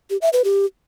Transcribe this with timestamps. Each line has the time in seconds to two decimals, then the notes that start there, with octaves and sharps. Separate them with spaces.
0.10 G4
0.22 E5
0.33 B4
0.44 G4